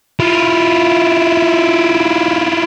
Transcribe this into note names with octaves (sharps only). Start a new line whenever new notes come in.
E4 F4